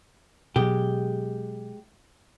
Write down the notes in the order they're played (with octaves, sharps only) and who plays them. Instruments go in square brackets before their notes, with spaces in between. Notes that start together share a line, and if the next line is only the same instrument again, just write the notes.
[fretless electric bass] B2 F#3 [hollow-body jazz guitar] G#3 G4